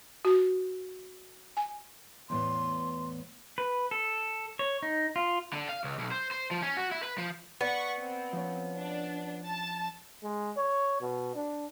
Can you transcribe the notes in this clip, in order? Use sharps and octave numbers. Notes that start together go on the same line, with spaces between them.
F#4
G#5
E2 A2 B3 C6
B4
A4
C#5
D#4
F4
D3
F5
C#2
B1
C5
C5
F3
C#4
F#4
E4
B4
F3
B3 D5 F#5 C#6 B6
C4
F3 C#4
D4
A5
G#3
C#5
B2
D4